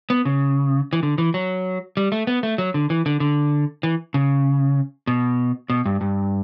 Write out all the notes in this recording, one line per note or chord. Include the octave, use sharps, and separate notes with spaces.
B3
C#3
E3
D3
E3
F#3
G3
A3
B3
A3
F#3
D3
E3
D3
D3
E3
C#3
B2
B2
G2
G2